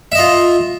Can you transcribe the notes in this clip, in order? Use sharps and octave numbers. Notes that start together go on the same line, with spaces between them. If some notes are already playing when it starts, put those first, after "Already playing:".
F4 D#5 E5